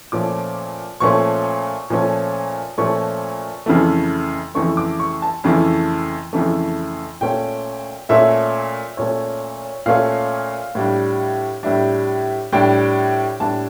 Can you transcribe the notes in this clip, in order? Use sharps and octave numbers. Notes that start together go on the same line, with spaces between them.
A#2 F3 A3 C#4 D6
A#2 F3 A3 C#4 C#6
A#2 F3 A3 C#4
A#2 F3 A3 C#4 C#6
F2 C#3 E3 A3
F2 C#3 E3 A3 C#6
D6
C#6
A5
F2 C#3 E3 A3
F2 C#3 E3 A3
A#2 A3 C#4 G5
A#2 A3 C#4 E5
A#2 A3 C#4 C#5
A#2 A3 C#4 F5
A2 G3 D4
A2 G3 D4 E5
A2 G3 D4 G5
A2 G3 D4 A5